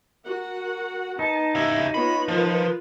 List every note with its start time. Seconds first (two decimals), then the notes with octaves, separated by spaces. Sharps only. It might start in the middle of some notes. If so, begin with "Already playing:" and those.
0.24 F#4 A#4 F#5
1.19 B3 D#4 A5
1.55 C#3 E4 G4
1.94 B3 F4 C#5 B5
2.28 F3 F4 A#4 B4